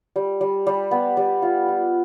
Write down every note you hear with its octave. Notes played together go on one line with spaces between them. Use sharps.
G3
G3
G3
B3
G3
F4
F4